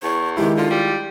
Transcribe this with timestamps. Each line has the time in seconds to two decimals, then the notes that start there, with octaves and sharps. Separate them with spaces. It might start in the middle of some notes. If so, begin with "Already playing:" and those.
0.03 E2 C#6
0.37 D#3 G#3 E4 G4
0.57 D3 F4
0.70 G3